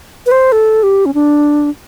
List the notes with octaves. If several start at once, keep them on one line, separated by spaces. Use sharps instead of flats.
B4
C5
A4
G4
C#4
D4